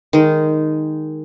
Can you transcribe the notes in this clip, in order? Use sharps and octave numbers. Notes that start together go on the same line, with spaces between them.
D#3 G#3